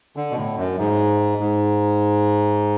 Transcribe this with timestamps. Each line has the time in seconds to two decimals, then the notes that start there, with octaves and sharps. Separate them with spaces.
0.16 D3
0.31 B2
0.37 A2
0.58 F#2
0.79 G#2
1.40 G#2